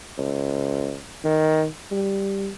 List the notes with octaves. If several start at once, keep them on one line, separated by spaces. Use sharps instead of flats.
C#2
D#3
G3